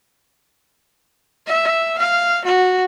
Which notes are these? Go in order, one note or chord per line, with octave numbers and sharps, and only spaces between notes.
E5
F5
F#4